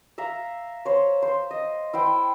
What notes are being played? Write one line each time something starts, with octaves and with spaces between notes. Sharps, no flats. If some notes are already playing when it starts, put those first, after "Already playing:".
E5 F5 A#5
C5 C#5
C5
D#5
E4 C5 G5